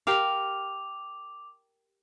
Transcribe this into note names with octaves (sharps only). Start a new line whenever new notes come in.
G4 A#4 F5 D6 F7